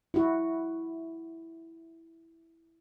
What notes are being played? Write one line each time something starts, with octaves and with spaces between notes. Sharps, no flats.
E4 F#4